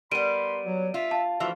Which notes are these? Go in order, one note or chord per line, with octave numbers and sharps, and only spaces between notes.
G3 B3 A#4 B5 C6 D7 D#7
F#3
F4 E5
F5 A5
D2 E3 F3 F4 F#4 E5